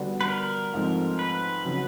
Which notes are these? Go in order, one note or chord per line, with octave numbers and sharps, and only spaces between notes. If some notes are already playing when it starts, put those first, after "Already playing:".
Already playing: D3 G3 B3 D4 F#4
B4
A#4
G#2 F3 A3 C4
B4
C#3 F#3